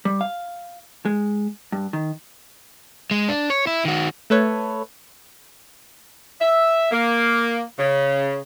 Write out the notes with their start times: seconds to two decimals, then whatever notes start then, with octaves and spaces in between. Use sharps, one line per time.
0.05 G3
0.21 F5
1.05 G#3
1.72 G2
1.93 D#3
3.11 G#3
3.28 D4
3.50 C#5
3.67 E4
3.85 D#3 F#4
4.30 A3 A4 B4 C#5
6.40 E5
6.91 A#3
7.78 C#3